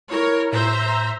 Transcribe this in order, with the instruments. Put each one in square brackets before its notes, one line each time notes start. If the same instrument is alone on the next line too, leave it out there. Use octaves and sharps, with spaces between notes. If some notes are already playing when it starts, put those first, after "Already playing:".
[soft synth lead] E4 [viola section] A#4 C#5
[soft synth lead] A2 [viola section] C5 E5 A#5